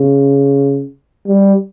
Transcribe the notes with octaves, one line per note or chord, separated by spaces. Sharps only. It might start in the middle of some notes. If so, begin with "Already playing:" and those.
Already playing: C#3
G3